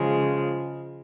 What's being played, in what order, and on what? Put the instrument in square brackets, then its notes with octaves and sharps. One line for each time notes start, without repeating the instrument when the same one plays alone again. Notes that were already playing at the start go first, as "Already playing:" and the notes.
Already playing: [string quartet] C#3 F3 G#3